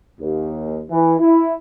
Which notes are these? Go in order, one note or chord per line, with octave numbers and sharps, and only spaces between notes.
D#2
E3
E4